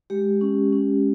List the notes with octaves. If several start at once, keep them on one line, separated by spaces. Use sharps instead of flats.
G#3 G4
C#4
C#4